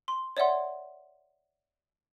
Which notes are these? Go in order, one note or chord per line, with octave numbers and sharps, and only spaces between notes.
C6
C#5 D5 E5 F#5 C6